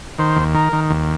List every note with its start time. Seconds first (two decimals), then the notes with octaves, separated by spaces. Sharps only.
0.18 D#3 C5
0.36 D#2
0.55 D#3 A#4
0.73 D#3
0.90 D#2